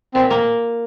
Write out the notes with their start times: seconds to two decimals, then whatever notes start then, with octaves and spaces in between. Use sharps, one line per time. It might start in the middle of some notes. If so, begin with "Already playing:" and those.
0.14 A#2 C4
0.30 A#3